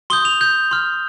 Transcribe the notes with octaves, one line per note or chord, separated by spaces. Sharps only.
C6 D#6 G6 G7
F7
G6
C6 F6